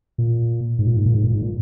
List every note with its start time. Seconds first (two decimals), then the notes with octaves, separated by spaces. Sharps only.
0.18 A#2
0.79 G#2
0.87 A#2
0.97 G#2
1.06 A#2
1.14 G#2
1.24 A#2
1.33 G#2
1.42 A#2